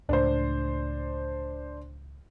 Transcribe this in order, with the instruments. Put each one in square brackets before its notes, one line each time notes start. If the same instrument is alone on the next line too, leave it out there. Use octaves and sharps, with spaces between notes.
[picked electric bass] C#2 A2 [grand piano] D4 C5